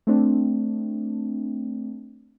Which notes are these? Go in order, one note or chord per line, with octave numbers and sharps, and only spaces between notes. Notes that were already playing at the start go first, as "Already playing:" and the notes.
A3 C4 D4